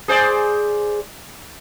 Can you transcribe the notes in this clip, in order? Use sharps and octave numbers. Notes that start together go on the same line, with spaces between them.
G#4 C5 D5